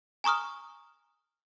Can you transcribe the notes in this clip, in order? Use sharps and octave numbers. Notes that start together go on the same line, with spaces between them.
G#5 A#5 C#6 D#6 F6